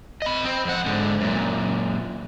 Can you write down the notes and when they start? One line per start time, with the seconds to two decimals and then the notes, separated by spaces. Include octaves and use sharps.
0.22 D#5 B5
0.44 C4
0.65 F2 F#5
0.86 G#2 D3
1.21 F#2 A#2